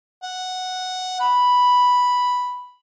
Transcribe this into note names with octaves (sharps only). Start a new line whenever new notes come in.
F#5
B5